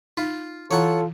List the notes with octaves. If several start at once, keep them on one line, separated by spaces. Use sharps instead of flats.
D#4 F4 F5
E3 E4 F4 A4 C#5 F#5 A#5 C#6